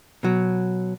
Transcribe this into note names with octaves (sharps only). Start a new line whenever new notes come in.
B2 F#3